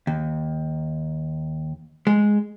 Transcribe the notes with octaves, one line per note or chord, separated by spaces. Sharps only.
D#2
G#3